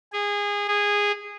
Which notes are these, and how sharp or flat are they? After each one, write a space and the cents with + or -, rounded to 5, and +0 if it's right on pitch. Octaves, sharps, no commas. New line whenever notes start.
G#4 -20
G#4 -15